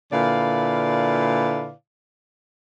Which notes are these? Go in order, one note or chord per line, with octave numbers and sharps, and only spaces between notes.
A#2 D3 E4 B4 D5 F5